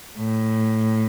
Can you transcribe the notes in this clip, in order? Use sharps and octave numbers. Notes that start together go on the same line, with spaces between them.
A2